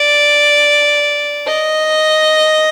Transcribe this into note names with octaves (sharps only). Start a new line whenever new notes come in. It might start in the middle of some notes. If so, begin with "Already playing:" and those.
Already playing: D5
D#5